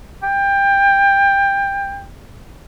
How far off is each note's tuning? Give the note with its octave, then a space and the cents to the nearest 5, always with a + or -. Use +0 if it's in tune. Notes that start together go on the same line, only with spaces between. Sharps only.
G5 +20